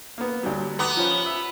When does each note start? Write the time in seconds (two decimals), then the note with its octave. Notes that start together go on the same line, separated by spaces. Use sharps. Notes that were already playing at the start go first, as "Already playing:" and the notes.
0.18 A#3 B3
0.43 D2 F#3 G3
0.79 B3 A#5 D6 D#6
0.97 F3 C#4
1.26 E5